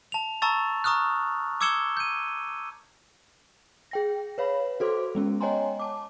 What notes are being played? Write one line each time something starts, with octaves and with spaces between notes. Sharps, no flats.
A5 F7
A5 A#5 C#6 E6 A6
A#5 C#6 D#6 F6 F#6
D6 E6 G#6 C#7 E7 G7
G6 D#7
G#4 G5 A#6
B4 C#5 F5 B5
F#4 A4 C5 C6 D6
G#3 B3 C#4
C#5 D#5 G5 G#5 A#5 C6
A5 D6